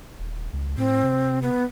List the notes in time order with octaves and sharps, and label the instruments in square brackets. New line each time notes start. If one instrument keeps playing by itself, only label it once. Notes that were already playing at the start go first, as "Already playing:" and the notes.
[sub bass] D#1
C#2
[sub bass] A2 [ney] C4
[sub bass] C3
[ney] B3